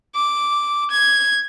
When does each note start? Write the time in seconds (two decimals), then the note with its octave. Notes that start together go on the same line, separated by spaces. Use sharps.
0.15 D6
0.91 G#6